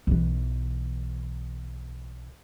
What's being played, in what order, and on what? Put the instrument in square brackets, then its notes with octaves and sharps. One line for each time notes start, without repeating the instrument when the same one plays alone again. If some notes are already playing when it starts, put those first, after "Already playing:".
[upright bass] B1 E3